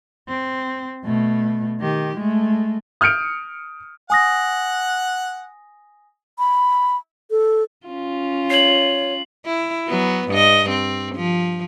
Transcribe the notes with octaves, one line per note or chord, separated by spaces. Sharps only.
C4
B2 A3
D#3 G4
G#3 A3
D#6 F6 G6 C#7 D7
F#5 G#5 D#6 A#6
B5
A4
C#4 F4
C#5 C7 F#7
E4
F#3 B3
G2 D#5
C4
F3